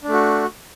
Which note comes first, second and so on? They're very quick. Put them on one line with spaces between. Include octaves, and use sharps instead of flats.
D4 A3 F#4